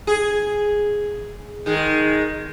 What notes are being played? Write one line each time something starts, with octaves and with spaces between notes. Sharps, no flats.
G#4
D#3 G#3